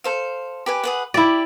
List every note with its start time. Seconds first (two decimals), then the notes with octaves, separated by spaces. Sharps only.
0.04 A4 C5 F5
0.66 G4 B4 G#5
0.83 G#4 B4 F#5
1.14 E4 G4 D5